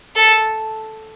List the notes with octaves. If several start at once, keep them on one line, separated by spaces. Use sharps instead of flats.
A4